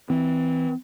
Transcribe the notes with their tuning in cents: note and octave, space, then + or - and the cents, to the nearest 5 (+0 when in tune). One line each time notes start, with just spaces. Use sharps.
E3 -15 C4 -25